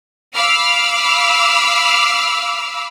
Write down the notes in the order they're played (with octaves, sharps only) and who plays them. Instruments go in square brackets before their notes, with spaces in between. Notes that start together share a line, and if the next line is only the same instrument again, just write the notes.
[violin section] F5 B5 D6 E6 F6